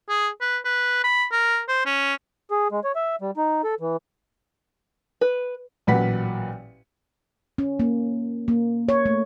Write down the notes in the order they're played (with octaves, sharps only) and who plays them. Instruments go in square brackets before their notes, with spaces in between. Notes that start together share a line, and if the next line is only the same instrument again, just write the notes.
[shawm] G#4
B4
B4
B5
A#4
C5
C#4
[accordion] G#4
G#3
C#5
E5
G3
D#4
A4
E3
[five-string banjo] B4
[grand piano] A1 A#2 F#3 B4 F#5 B6
[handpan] C#4
A#3
A#3
C#5
A3